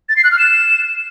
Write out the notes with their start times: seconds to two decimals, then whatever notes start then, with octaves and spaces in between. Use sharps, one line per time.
0.09 A6
0.16 C7
0.24 F#6
0.31 F6
0.39 E7